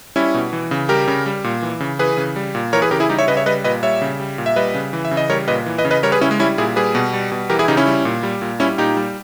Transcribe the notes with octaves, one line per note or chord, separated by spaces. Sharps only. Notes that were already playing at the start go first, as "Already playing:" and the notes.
G3 C#4 E4
B2
E3
C#3
G3 G4 A#4
C#3
G3
A#2
E3
C#3
E3 G#4 B4
C#3
G3
A#2
E3 A#4 C#5
G#4 B4
C#3 G4 A#4
E4 G#4
G3 D#4 G4
C#5 E5
C#3 B4 D#5
C#5 E5
G3 B4 D#5
A#2 B4 D#5
G3 C#5 E5
C#3
G3
A#2
E5
G3 B4 D#5
C#3
E3
E5
C#3
D#5
G3 A#4 C#5
A#2 B4 D#5
E3
B4 D#5
C#3
B4 D#5
G3 A#4 C#5
G#4 B4
C#3 C#4 E4
G#3
G3 C#4 E4
A#2 E4 G#4
G3 G#4 B4
B2
G3
B2
E3 G4 A#4
E4 G#4
C#3 D#4 G4
C#4 E4
G3
A#2
G3
A#2
G3 C#4 E4
A#2 D#4 G4
G3